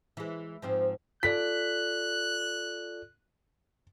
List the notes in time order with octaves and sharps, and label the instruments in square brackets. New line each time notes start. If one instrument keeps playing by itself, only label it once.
[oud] E3 G#3
G#2 F3 C4
[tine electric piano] F4 A4 D5 [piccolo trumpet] F#6 [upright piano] B6